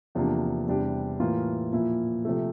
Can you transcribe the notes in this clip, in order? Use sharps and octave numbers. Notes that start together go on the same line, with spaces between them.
E2 C3 F3 A#3 D4
E2 C3 G3 D4 G4
A2 E3 A#3 F4
A#2 F3 A#3 E4
C3 F3 A3